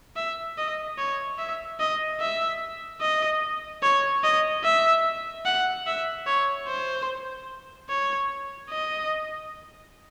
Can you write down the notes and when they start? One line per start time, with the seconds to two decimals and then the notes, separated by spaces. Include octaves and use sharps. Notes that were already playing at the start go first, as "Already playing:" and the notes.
0.16 E5
0.58 D#5
0.98 C#5
1.38 E5
1.80 D#5
2.21 E5
3.01 D#5
3.83 C#5
4.24 D#5
4.64 E5
5.45 F#5
5.87 E5
6.27 C#5
6.68 C5
7.90 C#5
8.70 D#5